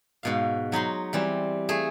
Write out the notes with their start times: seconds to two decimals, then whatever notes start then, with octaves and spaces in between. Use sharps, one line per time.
0.23 G#2 B2 F5
0.72 F#3 D#4 B5 C6
1.13 E3 G3 C4
1.69 A3 G#4